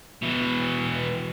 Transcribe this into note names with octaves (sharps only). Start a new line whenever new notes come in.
B2 E3